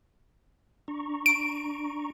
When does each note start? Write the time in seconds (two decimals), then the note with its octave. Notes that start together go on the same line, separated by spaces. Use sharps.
0.88 D4 A#5 C#6
1.26 D7